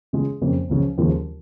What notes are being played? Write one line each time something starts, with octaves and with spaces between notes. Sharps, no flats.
C#3 G#3 F4 G#4
F2 C#3 A#3
C#2 C#3 F3 C#4
D#2 C#3 F3 G#3 F4